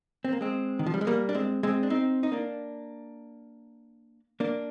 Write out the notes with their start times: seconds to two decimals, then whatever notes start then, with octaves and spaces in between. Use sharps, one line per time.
0.25 C4
0.32 A#3
0.41 G#3 C4
0.79 D#3
0.86 F3
0.94 G3
1.01 G#3
1.07 G3 A#3
1.29 D4
1.35 G#3 C4
1.63 G#3 C4
1.83 D4
1.90 C4 D#4
2.23 D#4
2.32 A#3 D4
4.40 A#3 D4